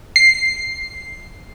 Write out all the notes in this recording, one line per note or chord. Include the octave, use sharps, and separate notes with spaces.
C7